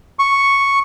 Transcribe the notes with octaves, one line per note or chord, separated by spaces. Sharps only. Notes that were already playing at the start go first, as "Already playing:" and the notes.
C#6